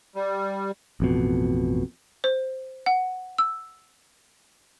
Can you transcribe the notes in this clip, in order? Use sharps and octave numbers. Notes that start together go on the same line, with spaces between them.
G3
A1 F2 B2
C5
F#5
E6